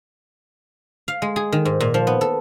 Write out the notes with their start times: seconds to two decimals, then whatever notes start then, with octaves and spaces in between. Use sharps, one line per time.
1.08 F5
1.22 G#3
1.36 G#4
1.52 D#3
1.65 G#2
1.80 A#2
1.94 F3
2.07 B3
2.21 A4